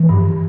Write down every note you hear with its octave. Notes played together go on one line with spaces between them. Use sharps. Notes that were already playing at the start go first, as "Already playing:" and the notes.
Already playing: E3
G2